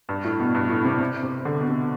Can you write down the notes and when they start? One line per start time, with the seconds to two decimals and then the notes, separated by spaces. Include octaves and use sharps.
0.09 G2
0.24 A2
0.40 B2
0.55 G2
0.70 A2
0.85 C3
1.00 C3
1.23 C3
1.45 D3
1.60 B2
1.68 C3